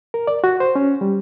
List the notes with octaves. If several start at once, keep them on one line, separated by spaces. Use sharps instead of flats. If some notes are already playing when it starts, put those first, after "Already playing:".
A#4
D5
F#4
C5
C#4
G3